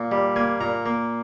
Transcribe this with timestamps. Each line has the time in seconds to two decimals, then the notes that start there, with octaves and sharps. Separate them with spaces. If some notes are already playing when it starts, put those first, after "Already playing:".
Already playing: A#2
0.11 G3
0.36 A#3 G#5
0.61 A#2 A#5
0.86 A#3